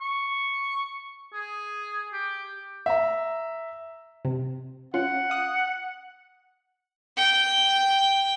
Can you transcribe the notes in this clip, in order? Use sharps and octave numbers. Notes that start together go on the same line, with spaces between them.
C#6
G#4
G4
E5 A#5
C3
C#4 F4 F#5
F5 D#6 F#6
G5